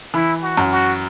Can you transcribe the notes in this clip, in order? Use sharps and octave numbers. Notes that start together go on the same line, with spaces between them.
E3 E4
F#4
F#2
F#4